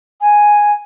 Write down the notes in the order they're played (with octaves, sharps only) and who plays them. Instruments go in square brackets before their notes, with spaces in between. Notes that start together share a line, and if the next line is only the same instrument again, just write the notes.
[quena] G#5